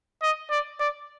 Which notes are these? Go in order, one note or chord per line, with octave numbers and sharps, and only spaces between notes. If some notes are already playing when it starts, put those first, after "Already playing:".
D#5
D5
D5